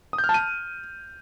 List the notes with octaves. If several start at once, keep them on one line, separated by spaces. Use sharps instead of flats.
D#6
G6
F6
A5
D#7